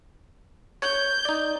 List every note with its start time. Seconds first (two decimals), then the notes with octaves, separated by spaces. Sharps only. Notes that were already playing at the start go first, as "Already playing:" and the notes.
0.82 C#5 G6
1.25 D#4 D5